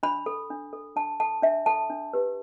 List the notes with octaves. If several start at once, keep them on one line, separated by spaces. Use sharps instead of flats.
D4 B5
A4
D4
A4
D4 A5
A4 A5
D4 E5
A4 A5
D4
G4 B4